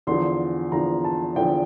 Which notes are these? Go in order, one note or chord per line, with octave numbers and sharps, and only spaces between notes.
E2 D3 F3 C6
E2 D3 F3 A#5
A5
E2 D3 F3 G5